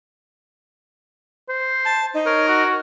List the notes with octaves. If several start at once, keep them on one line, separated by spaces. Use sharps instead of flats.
C5
A5
D#4
A#4 C#5
F#4